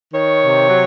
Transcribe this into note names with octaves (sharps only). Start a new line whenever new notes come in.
D#3 C#5
C3
F#3